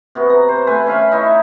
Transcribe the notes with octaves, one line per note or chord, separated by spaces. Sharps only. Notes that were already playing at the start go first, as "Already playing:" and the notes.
C3 B3 F#4
A#5
C5
A3 B4 G#5
C#4 E5 F5 B5
D#4 E4 C#5 E5